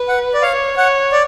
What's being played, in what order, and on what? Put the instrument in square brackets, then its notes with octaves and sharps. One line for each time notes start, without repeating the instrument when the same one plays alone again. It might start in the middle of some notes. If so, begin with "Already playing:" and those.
Already playing: [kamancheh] B4
[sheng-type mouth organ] F#5
D5
[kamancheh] C#5 [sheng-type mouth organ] F5
[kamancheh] C#5 [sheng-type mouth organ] F#5
[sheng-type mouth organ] D5